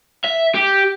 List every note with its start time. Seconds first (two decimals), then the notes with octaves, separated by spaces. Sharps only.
0.24 E5
0.55 G4